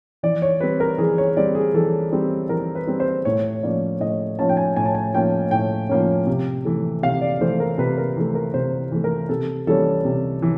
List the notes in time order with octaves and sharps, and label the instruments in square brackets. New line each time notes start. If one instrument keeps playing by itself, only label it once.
[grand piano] E3 D5
C#5
G3 C4 B4
A#4
E3 G#4
C#5
G3 C4 D5
G#4
E3 A4
G3 C4
E3 A#4
B4
G3 C4
C5
A2 C#5
F3 A#3 C#4 D5
A2 D#5
F3 A#3 C#4 A5
G5
G#5
A2 G#5
A5
G#5
F3 A#3 C#4 G5
A2 G5
F3 A#3 C#4
C3
E3 A3
C3 F5
D5
E3 A3 C5
A#4
C3 B4
A#4
E3 A3
A#4
C3 C5
E3 A3
A#4
C3 A4
E3 G3 A#3 C#4 A4
C3
E3